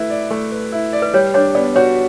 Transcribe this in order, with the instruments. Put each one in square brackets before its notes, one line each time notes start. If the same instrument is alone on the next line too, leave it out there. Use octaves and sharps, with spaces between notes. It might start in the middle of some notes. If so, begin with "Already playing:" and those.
Already playing: [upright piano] A3 E4 B4
D5
A3
B4
E4
D5
[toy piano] B4
[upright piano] G3 [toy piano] C#5
[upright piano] D4 [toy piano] C#5
[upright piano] B3 [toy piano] D5
[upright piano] F#4 [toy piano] C#5